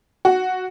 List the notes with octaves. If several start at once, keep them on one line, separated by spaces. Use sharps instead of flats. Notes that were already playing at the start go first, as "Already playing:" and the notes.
F#4